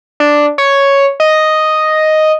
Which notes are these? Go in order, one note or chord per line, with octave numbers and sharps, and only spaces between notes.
D4
C#5
D#5